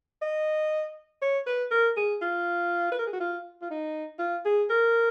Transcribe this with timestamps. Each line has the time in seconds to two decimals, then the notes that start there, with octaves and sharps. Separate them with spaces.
0.22 D#5
1.22 C#5
1.47 B4
1.71 A#4
1.97 G#4
2.22 F4
2.92 B4
2.99 A#4
3.07 G#4
3.13 F#4
3.20 F4
3.62 F4
3.71 D#4
4.19 F4
4.45 G#4
4.70 A#4